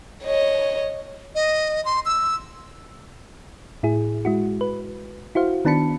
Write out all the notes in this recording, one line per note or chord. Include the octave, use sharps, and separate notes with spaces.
C#5 D#5
D#5
C6
E6
A2 E4 G#4
G#3 E4 F#4
B4
E4 F#4 C5 F5
D#3 B3 D4 A5 B5 C#7